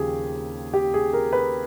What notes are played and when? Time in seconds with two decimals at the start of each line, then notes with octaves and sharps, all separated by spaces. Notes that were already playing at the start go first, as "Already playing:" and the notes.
Already playing: D#2 C#3 F3 G4 G#4
0.74 G4
0.94 G#4
1.13 A#4
1.33 B4